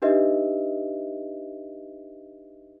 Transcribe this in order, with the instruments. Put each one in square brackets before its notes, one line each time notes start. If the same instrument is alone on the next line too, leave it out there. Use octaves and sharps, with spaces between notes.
[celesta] D4 D#4 G4 B4 D#5 E5